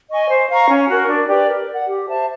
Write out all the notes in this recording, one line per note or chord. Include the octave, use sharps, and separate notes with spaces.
D#5 G#5 C#6
C5
F5 A#5 C#6
C#4
F#4 A#4
D4
G4 B4 D5
A#4
D5 F#5
G4
C5 E5 A5